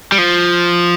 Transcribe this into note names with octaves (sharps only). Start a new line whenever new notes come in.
G3
F3